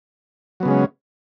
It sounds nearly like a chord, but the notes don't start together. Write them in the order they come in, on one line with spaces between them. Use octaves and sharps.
F#3 B3 C#3 G#3 C#4